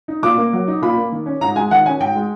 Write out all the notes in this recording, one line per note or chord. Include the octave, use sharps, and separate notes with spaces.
D#4
A#2 D6
A#3
F#3
D#4
A#2 B5
A#3
D#3
C#4
G#2 A#5
G#3 G#5
D#3 F#5
C#4 G#5
G#2 G5
G#3